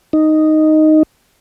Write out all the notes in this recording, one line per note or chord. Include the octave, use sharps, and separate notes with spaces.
D#4